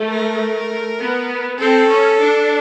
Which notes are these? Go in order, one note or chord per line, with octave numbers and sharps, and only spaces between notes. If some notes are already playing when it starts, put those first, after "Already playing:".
Already playing: A3
A#4
B3
C4 A4
C#4
D4